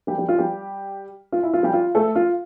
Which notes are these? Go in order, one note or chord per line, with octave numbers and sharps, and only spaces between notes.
G3 G4
G3 G4
F4
G3 G4
F4
E4
F4
G3 G4
F4
A3 A4
F4